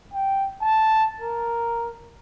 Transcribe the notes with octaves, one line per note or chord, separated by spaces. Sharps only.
G5
A5
A#4